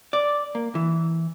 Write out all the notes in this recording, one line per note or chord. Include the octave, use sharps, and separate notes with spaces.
D5
A#3
E3